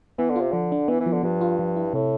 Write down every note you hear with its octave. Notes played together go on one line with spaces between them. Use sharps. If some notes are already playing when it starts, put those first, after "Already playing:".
E3 B3
D3
C3 F4
D3 F3
D4
E3 B3
E3
F3
D3
G2 F3
F4
F3
E4
A2 C3